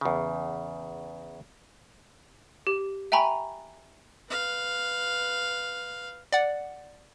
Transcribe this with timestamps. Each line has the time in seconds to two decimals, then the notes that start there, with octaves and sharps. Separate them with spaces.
0.01 E2 C#3
2.67 G4
3.12 E5 G5 G#5 A#5 B5 C#6
4.29 B4 F5
6.33 D5 F#5